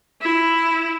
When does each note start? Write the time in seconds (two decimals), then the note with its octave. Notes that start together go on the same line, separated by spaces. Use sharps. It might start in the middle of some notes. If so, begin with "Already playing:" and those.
0.21 E4